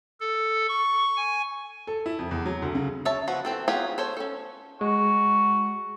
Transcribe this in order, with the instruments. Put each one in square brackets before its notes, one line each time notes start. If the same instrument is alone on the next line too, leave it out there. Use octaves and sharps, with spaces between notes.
[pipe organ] A4
C#6
G#5
[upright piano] A4
E4
F2
E2
F#3
D2
C#3
[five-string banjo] C#5 E5 A5
F3 B3 F#4
E3 C4 A4
B3 F4 G4 G#4 C#5
A4 C5 C#5
C#4 A4
[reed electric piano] G#3 [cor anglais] F#4